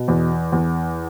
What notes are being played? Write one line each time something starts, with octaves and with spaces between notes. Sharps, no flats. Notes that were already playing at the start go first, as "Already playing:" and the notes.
Already playing: B2
E2
E2